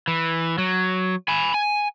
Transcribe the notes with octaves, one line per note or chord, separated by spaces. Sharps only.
E3
F#3
G#5 B5
G#5